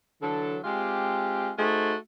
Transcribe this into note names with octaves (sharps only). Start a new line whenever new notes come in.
D3 E3 F#3 A4
G#3 C4 F4 G4
A3 D#4 F#4 G#4 C5